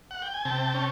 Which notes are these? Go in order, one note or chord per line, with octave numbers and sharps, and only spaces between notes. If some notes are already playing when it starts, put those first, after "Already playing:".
F#5
G5
G#5
C3 G5 A5
C#4